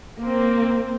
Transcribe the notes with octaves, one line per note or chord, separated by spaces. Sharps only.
A#3 C4